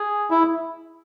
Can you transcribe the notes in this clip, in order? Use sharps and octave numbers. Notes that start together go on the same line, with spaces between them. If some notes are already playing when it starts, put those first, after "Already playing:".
Already playing: G#4
E4